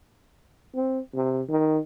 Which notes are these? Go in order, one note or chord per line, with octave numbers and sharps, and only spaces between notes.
C4
C3
D#3